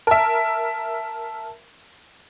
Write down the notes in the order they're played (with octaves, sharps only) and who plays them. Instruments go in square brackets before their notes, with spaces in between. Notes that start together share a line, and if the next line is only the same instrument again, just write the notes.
[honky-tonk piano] A#4 E5 [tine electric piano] A5